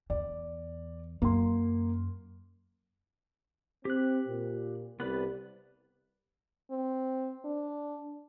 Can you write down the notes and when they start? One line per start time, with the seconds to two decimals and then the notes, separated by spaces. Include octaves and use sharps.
0.10 E2 D5
1.22 F#2 A#3 C6
3.85 C4 G4 F#6
4.27 A#2
5.00 C2 B3 B4 D5
6.71 C4
7.45 D4